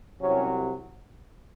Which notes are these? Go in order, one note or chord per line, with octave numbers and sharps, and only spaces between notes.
C2 C3 F#3 C#4